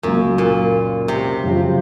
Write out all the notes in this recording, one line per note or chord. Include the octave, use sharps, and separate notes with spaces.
C#2 F#2 C#3 F#3 A#3
A#2
C3
F#2 C#3 F3